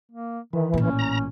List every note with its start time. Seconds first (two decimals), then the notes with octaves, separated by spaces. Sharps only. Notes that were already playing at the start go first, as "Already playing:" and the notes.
0.12 A#3
0.53 D#3 E3
0.74 A1 A#2 C#4
0.99 A#5